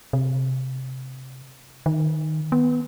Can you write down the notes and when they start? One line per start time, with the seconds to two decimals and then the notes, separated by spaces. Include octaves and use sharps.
0.13 C3
1.86 D#3
2.52 B3